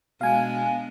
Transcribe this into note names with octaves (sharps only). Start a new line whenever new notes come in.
B2 G#3 B3 D4 F5 G#5